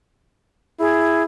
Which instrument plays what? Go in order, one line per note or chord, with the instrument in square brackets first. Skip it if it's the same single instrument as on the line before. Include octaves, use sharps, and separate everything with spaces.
[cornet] E4 [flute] G#4